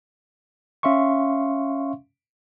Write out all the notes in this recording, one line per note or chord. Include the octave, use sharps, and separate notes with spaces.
C#4 E5 F5 C6 C#6